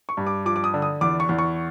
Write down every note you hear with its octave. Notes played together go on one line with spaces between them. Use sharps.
C#6
G2
D6
F3 D6
D6
D#6
D3
D#6
E2 D6
C#6
E2
C#6